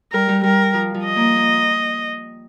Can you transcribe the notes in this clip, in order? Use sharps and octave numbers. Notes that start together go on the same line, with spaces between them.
G3 A#4
G3
G3 A#4
F3
F3
D#5
A#3
A#3